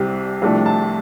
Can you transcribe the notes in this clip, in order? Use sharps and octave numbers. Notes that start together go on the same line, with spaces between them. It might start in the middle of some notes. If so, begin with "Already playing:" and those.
Already playing: C2 C3 G3
C2 C3 F3 A3 D4
A5